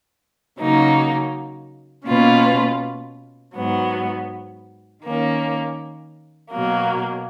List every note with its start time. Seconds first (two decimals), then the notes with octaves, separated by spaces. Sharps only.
0.60 C#3 F#3 A#3 D#4
2.08 B2 A#3 C#4 F4 B4
3.56 G#2 F#3 B3
5.03 D#3 A#3 C#4
6.51 B2 F#3 A#3